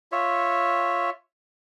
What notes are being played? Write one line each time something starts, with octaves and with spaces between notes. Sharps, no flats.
F4 C#5 E5